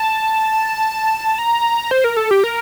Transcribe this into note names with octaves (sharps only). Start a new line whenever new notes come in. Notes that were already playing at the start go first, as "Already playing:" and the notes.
Already playing: A5
A#5
C5
A#4
A4
G4
A#4